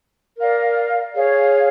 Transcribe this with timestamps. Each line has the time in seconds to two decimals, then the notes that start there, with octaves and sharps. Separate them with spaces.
0.38 A#4 D5 F5
1.16 G#4 C#5 F5